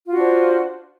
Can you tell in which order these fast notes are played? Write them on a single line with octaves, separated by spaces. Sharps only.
F4 F#4 D4 C5